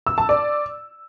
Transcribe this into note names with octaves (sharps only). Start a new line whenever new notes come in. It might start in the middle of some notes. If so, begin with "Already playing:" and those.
E6
A5
D5